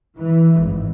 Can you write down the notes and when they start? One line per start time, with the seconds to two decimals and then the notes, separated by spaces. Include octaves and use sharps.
0.17 E3
0.60 G#1